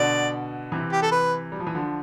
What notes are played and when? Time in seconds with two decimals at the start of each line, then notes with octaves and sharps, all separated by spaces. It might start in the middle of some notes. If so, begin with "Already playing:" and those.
Already playing: B2 D3 D5
0.72 C3 E3
0.92 G4
1.02 A4
1.11 B4
1.52 G3
1.60 F3
1.67 E3
1.75 D3 F3